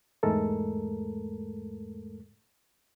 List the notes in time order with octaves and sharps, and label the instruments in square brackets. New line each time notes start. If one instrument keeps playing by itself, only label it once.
[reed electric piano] E2 G#2 G#3 A3 A4 A#4